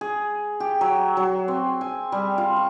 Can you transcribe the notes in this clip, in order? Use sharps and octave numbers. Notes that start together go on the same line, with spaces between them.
G#4
G4
F#3
F#3
C4
G#5
G3
F4
C#6